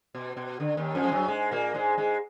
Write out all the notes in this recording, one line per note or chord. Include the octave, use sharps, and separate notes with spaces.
B2
B2
D3
D#2 D#3
F2 F3
G#3
F#2 F#3
G#2 G#3
A#2 A#3
G#2 G#3
G#2 G#3